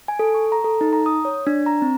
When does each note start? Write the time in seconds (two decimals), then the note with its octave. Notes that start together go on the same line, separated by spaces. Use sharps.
0.08 G#5
0.19 A4
0.34 C#6
0.52 A#5
0.64 A4
0.81 D#4
0.93 A#5
1.06 D#6
1.25 C#5
1.47 D4
1.66 A#5
1.82 C4